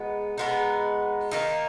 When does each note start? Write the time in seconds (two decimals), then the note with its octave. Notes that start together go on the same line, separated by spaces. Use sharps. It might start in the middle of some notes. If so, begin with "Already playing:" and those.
Already playing: B2 G#3 B3 D#4
0.38 B2 G#3 B3 D#4
1.31 D#3 A#3 D#4